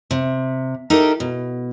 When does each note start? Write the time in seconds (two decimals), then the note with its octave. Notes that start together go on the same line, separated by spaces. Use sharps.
0.11 C3
0.90 D#4 E4 G4 A4 A#4
1.20 B2